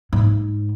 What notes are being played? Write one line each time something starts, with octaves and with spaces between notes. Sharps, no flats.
G#2